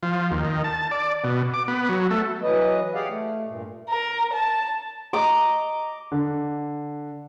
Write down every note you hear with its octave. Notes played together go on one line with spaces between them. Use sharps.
F3
D#2
D#3
A5
D5
B2
D6
B3
F#3
A3
E3 F#3 B4 D#5
G4 G#4 D5 F5 F#5
A3
G2 A#2
A#4
A5
D#5 A#5 D6
D3